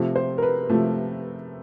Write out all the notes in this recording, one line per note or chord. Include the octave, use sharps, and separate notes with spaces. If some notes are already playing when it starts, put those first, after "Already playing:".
Already playing: C3 F3 A3
C5
A#4
B4
C3 F3 A3